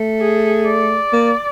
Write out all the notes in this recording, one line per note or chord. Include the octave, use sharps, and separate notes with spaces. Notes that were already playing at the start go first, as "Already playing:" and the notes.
Already playing: A3
G#4
D5
A#3